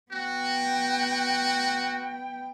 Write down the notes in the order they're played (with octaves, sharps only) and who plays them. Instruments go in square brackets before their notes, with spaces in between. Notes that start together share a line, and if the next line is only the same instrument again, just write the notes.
[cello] B3 G5 [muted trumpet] F#4